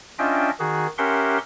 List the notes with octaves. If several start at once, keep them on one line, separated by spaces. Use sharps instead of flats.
C#4 D4 F4 D#5 E5 G5
D#3 F#4 G#4
C#4 G4 A#4 E5 F#5 C6